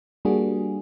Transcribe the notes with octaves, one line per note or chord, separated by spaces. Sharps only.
G3 A#3 D4 F#4 G#4